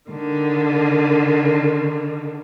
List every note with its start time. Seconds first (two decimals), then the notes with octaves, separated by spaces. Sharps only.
0.10 D3 D#3